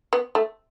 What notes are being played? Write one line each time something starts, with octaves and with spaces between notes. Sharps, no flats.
B3
A3